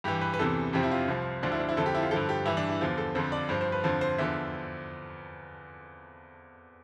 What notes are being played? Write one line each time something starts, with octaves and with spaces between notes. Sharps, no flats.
G2 E3 G4
B4
B4
E2 C3 E3 A4
F2 C3 F3 G4
E4
F4
C2 C3 F3
D2 D3 F3 D4
E4
D4
E4
F2 D3 F3 A4
G4
E4
F4
G2 D3 F3 A4
G4
G2 E3 E4
D4
E4
E2 D3 F3 F4
A4
F2 D3 F3 C5
D5
G2 F3 C5
C5
B4
F2 D3 F3 C5
C5
E2 D3 F3 E5